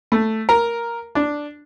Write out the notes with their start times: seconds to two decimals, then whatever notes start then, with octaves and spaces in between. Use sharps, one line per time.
0.12 A3
0.49 A#4
1.15 D4